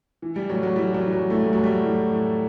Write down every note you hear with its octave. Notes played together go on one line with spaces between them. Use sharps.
E3
G3
A2 F#3
F#3
E3 G3
F#3
E3
F#3
E3 A3
G3
A2 F#3
G3
A2
A2